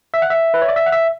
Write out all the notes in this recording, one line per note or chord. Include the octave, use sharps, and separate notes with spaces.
E5
F#5
E5
B4
C#5
D5
E5
F#5
E5